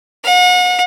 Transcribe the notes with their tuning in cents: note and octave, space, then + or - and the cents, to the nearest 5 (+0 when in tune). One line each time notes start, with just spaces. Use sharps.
F#5 -40